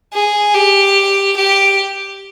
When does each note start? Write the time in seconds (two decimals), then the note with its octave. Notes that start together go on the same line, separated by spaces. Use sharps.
0.13 G#4
0.54 G4
1.36 G4